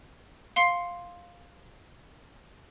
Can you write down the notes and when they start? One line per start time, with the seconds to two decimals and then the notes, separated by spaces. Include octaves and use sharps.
0.56 F5 C6 C7 C#7